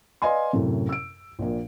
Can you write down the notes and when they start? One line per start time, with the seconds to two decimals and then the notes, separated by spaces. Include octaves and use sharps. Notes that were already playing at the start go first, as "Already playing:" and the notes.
0.22 B4 D5 D#5 F5 G#5 C6
0.53 F#2 A2 C3
0.89 E6 D7
1.39 A#1 A#2